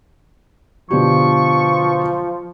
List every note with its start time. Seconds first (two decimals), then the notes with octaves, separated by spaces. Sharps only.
0.90 B2 D3 F3 G4 C#6